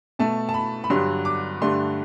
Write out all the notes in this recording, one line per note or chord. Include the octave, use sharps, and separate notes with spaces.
B2 A3 A5
A5
B5
B5
G2 D3 F#3 C6
D6
G2 D3 A3 C6